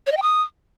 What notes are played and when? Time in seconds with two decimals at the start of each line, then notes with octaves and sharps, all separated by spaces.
0.07 C#5
0.12 D#5
0.17 G5
0.22 D#6